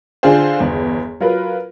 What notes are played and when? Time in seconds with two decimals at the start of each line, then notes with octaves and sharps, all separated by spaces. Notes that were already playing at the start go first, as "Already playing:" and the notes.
0.23 D3 D4 F4 G#4 C5
0.60 G1 E2
1.20 F#3 F4 A#4 B4